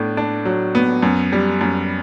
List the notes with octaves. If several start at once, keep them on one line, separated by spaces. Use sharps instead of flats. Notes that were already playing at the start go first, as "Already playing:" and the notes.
Already playing: A2 B3 D4
D4
F#3
B3
F#2
G3
F#2